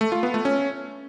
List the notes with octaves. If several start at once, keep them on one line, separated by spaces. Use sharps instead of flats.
A3
F4
B3
A3
C#4